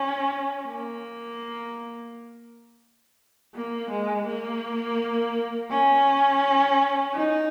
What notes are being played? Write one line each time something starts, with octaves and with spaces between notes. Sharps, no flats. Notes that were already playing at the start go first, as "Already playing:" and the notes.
Already playing: C#4
A#3
A#3
G#3
A#3
C#4
D#4